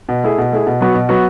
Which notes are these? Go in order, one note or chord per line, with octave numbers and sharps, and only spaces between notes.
B2
A3 E4 G#4
B2
A3 E4 G#4
B2
F#3 B3 F#4
B2
F#3 B3 F#4